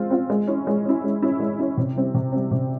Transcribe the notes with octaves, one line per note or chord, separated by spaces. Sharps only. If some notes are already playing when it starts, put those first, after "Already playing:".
Already playing: G#3 C4 F4
C4 F4
G#3
C#4 E4
G#3
C#4 E4
G#3
C#4 E4
G#3
C#4 E4
C3
G3 C4
C3
G3 C4
C3